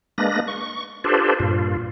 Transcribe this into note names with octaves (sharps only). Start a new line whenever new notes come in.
G#3 A#3 D4 B4 A#6
C#6
D4 F4 G4 A4 B4 C5
G2 A#2 F4